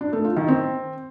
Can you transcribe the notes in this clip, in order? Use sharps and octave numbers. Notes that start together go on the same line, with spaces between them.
D4
A3
F4
D#3
C4